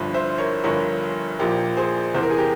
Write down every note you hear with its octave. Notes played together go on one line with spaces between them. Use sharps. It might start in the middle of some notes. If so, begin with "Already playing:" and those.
Already playing: G1 G2 F3
C5 E5
A#4 C#5
G1 G2 F3 A#4 C#5
A#1 A#2 F3 G4 A#4
G#4 C5
E2 C3 E3 C5
A#4
G#4
G4 A#4